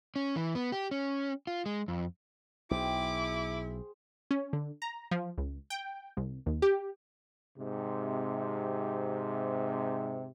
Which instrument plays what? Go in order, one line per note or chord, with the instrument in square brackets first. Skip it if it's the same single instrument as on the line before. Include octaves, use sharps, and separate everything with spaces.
[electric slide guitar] C#4
E3
B3
G4
C#4
F4
G#3
F2
[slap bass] B1 [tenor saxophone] E4 [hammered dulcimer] G#4 C5 G5 [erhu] D6
[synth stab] C#4
D3
A#5
F3
C#2
G5
C2
D#2
G4
[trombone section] G#2 C3